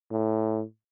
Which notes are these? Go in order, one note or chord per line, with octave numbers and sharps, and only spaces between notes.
A2